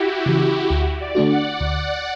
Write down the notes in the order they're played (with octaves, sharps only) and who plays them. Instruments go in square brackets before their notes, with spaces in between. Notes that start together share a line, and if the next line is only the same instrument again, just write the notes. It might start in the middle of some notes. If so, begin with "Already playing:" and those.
Already playing: [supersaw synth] E4 F#4 G4
[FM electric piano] C#3 E3
[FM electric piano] D2 [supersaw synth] F#4
[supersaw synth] D5
[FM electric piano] D3 A3 D4 F#4
[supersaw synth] F#5
[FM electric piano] D2 [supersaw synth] F#5